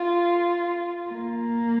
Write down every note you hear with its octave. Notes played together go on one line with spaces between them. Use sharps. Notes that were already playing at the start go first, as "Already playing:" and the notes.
Already playing: F4
A#3